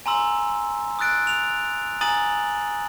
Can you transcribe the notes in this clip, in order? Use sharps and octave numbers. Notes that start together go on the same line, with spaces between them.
G#5 A#5 C6 E6
D#6 E6 F#6 A6 D7
F7
G#5 A#5 D#6 A6 D#7 F#7